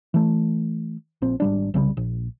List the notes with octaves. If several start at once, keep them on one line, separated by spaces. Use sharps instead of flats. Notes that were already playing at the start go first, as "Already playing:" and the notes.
E3 A3
A#1 A#2 C4
G#1 G3 D4
C2 C#3 F#3 G3
A#1